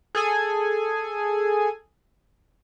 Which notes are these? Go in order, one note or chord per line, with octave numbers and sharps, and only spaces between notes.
G#4 A4 G#5